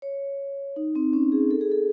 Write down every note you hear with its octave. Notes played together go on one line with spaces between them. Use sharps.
C#5
D#4
C4
C#4
G#4
A4
G#4
A4